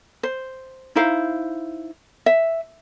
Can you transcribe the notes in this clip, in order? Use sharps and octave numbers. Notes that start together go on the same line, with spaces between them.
C5
D#4 E4 C5 F5
E5